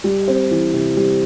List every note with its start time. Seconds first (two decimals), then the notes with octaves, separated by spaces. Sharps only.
0.04 G3
0.28 C4
0.51 E3
0.74 C3
0.97 G3